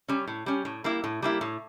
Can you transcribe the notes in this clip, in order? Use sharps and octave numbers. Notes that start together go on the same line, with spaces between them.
G3 C#4
A2
G3 C#4
A2
G3 A#3 E4
A2
G3 A#3 E4
A2